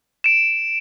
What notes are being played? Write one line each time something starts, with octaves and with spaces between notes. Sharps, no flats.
D7 E7